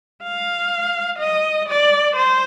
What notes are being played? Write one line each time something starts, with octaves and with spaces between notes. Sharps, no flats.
F5
D#5
D5
C5